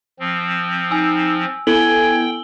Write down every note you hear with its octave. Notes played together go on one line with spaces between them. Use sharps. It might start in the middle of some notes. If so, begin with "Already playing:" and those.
F3 C4
D#4 G#5 E6
B3 E4 A4 G5 G#5 F#7 G7